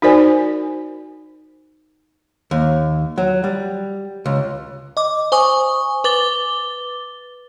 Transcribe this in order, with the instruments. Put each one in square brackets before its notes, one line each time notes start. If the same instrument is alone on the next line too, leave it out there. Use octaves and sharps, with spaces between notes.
[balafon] D#4 F#4 A#4 C5 D5 G#5
[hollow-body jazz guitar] D#2
F#3
G3
C#2
[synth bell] D#5 D6
C5 G#5 C#6 D#6
B4 D6 A6 G7